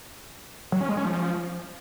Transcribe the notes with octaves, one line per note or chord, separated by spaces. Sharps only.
F#3
C#4
G#3
C#4
F3